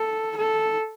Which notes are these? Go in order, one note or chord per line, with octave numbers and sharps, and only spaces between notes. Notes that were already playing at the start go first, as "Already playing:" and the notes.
Already playing: A4
A4